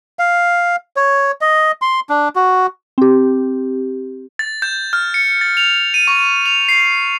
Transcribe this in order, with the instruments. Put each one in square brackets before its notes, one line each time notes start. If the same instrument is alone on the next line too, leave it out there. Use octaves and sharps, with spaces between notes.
[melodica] F5
C#5
D#5
C6
D4
F#4
[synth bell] C4 G4
[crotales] A6
G6
F6
C#7
A6
F7
D#7
C#6
F7
C7